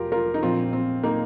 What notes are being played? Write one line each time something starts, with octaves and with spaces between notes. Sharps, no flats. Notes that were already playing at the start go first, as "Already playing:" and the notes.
Already playing: F1 F4 G4 A#4
F4 A#4
D#4
A#1 A#2 F3 C4 F4
C4
A#3 D#4